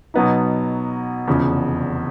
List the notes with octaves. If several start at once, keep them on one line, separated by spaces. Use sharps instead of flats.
B2 F#3 B3 D#4
F1 E2 C#3 F3